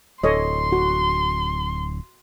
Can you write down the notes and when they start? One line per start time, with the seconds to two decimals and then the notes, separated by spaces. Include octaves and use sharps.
0.24 D1 A4 C#5 D#5 C6
0.72 F#4